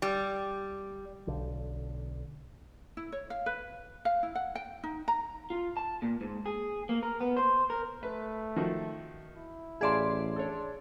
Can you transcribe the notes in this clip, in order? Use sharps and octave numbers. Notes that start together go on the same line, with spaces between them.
G3
B1 D3
E4
C#5
F5
B4
F5
E4
F#5
G5
D#4
A#5
F4
A5
A#2
G#2
G#4
A#3
A#4
B3
C5
A#4
A3 B4
D#3 F3 F#4
E4
A1 G#4 D5 E5 F5 A5 C6
D4 A4 C#5